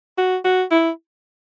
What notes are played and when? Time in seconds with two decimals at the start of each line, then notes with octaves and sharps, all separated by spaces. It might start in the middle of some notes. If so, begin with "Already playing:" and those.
0.18 F#4
0.45 F#4
0.71 E4